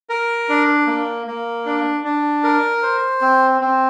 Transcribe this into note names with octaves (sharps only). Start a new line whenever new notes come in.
A#4
D4
A#3
A#3
D4
D4
A#4
C5
C4
C4